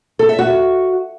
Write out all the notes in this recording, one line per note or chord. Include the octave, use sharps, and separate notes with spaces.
A4
E5
F#4